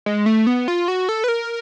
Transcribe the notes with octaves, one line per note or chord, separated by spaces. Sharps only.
G#3
A3
B3
F4
F#4
A4
B4
A#4